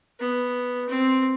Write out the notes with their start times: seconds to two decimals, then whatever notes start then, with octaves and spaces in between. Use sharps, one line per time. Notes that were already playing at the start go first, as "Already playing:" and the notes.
0.20 B3
0.89 C4